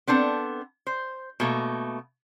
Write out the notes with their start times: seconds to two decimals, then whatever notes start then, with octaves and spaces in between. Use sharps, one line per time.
0.07 B3 C4 D4 A4
0.87 C5
1.40 B2 A3 A#3